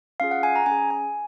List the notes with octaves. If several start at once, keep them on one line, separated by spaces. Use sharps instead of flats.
C#4 F4 G#4 F5
F#5
G#5
A#5
C#4 G#4 G#5
G#5